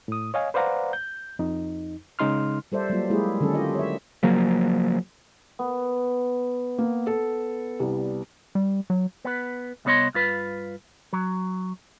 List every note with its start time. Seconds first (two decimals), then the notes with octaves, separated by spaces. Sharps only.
0.08 A2 D#6
0.34 C#5 D#5 F5 G#5
0.54 B4 C5 D5 F5 F#5 A#5
0.93 G6
1.39 F2 D#4
2.19 C#3 G#3 D#4 C6 F6
2.72 G3 A4 C5 D5 E5
2.90 F#3 G3 A#3 F4
3.10 G#3 A#3 E4 G4 G#4
3.40 D3 D#3 F#3 C#4 A4
3.54 F4 G4 D#5
3.75 C#5 E5
4.23 C#3 F3 F#3 A#3
5.59 B3
6.78 A#3
7.07 A4
7.80 C2 G3
8.55 G3
8.90 F#3
9.25 B3 B4
9.85 C2 G3 B3 C#5 D#5 C6
10.14 G2 F4 B4
11.13 F#3